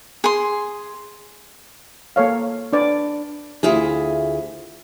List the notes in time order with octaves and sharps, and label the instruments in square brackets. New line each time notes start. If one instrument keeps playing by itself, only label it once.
[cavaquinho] G#4 C6
[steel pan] A#3 A4 C#5 F5
D4 B4 D5
[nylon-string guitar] D2 E4 F4 G#4